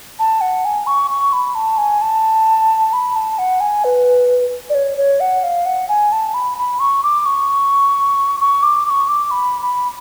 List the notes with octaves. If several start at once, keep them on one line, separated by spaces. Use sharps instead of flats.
A5
F#5
G#5
C#6
C#6
B5
A5
G#5
A5
B5
A5
F#5
G#5
B4
D5
C#5
C#5
F#5
F5
F#5
G#5
A5
B5
B5
C#6
D6
C#6
C#6
D6
D6
C#6
D6
B5
B5